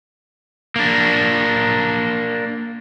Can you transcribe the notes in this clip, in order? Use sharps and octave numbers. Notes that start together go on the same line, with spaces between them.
A#3 D4